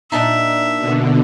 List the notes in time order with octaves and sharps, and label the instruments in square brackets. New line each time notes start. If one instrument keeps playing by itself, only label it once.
[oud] A#2 D4 D#4 [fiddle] E5
[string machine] B2 D3